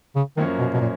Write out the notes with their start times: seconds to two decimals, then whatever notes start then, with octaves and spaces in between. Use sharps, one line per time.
0.16 C#3
0.37 F#2 D#3 F3 A#3 C#4
0.59 B2
0.74 B2
0.81 A#2